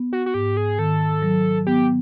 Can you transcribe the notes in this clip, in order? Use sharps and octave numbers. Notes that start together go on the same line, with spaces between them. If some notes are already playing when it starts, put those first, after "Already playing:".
Already playing: B3
F#4
F#4
G#2 G4
G#4
D#3 A4
F#3
B3 G4